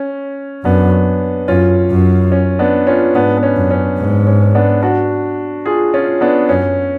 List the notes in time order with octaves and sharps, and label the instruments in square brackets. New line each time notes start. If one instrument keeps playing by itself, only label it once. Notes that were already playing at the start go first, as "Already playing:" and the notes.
Already playing: [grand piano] C#4
[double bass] F#2 [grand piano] B3 D4
[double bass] F#2 [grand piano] C#4 F4
[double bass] F#2
[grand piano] C#4
B3 D4
C#4 F4
[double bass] G#2 [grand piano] B3 D4
[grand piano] B3
C#4
[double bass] F#2
[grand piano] C#4
[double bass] G#2
[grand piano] C#4
B3 D4
D4 F#4
F4 G#4
C#4 F4
B3 D4
[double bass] F#2 [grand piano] C#4